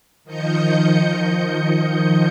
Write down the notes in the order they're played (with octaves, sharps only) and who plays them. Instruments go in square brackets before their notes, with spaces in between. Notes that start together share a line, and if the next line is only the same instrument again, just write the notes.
[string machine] D#3 F3 D#5 G6 C#7